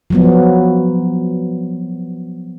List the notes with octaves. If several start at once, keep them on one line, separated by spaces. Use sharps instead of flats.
F3 F#3 B3